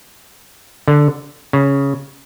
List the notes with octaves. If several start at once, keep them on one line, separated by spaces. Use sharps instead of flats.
D3
C#3